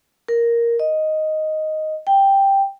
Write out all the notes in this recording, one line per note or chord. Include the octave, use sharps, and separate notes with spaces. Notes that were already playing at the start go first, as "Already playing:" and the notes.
A#4
D#5
G5